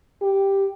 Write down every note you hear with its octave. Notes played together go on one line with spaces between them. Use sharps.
G4